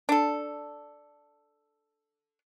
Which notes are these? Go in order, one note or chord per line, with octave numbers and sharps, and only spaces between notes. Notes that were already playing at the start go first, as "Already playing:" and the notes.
D4 A4